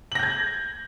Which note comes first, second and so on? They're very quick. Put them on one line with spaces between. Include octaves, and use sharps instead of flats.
F#7 A#6 G6 G#6